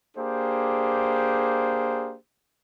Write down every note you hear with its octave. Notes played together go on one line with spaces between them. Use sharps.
A#3 D4 G4 G#4 C5